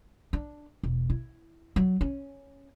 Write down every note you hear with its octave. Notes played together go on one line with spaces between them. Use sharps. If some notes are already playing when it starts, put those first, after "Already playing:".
D4
E1
E4
F#3
C#4